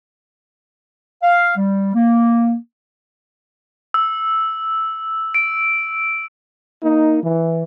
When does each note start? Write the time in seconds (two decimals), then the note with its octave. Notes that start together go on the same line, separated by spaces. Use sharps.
1.23 F5
1.57 G3
1.95 A#3
3.94 E6
5.34 D7
6.83 A#3 D#4
7.23 E3